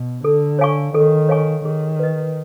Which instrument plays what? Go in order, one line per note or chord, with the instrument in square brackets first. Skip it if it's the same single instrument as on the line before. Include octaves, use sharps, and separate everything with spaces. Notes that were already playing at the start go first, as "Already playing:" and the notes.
Already playing: [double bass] B2
[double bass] D3 [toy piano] A4
[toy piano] C#5 F5 G#5 C#6
[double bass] D#3 [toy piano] A4
[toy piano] C#5 F5 G#5 C#6
[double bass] D#3 [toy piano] G#4
[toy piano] B4 D#5